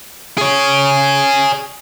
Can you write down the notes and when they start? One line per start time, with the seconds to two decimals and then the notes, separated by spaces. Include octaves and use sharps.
0.38 G#4 C#5